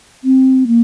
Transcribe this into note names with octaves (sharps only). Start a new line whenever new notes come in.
C4
A#3